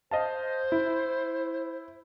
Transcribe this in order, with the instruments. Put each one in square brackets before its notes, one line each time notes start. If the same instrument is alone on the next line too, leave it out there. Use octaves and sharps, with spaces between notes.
[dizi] C5 [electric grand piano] D#5 F5 A5
[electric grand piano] E4